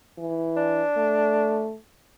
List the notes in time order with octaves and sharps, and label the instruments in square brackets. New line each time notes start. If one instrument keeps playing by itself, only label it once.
[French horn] E3
[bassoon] D4
[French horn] A3